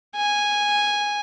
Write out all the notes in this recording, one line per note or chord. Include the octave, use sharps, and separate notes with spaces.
G#5